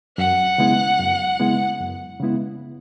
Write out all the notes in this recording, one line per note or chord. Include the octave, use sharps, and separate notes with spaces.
F#2 F#5
C#3 G#3 B3 E4
F#2
C#3 G#3 B3 E4
F#2
C#3 G#3 B3 E4